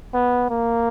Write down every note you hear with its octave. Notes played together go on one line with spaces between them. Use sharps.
B3
A#3